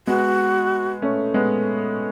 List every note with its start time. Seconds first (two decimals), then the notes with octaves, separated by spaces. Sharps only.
0.07 G#3 B3 F#4
1.02 A3 C#4
1.34 G#3 B3